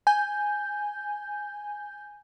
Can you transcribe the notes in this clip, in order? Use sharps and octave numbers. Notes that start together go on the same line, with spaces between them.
G#5 G6